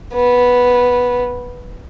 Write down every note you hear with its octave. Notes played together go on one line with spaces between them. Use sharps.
B3